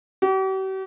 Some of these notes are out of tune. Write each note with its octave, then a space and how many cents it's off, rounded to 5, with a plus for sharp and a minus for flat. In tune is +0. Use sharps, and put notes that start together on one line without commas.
G4 -45